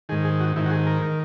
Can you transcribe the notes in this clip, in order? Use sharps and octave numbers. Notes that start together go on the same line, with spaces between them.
G#2 D#3 G#4
G#4
F#4
G#2 D#3 E4
F#4
G#4
A#4
D#3